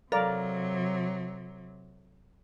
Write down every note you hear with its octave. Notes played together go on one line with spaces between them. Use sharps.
C3 F#3 A4 A#4 D5 F5